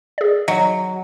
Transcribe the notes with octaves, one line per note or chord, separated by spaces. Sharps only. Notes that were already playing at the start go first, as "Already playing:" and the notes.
G#4 D5
F#3 D#5